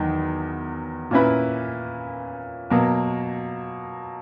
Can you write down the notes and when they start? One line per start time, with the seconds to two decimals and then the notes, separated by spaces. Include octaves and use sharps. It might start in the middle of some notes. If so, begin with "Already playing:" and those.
Already playing: E2 D#3 F#3
1.11 A#2 A#3 C#4 E4 B4
2.70 B2 F#3 A#3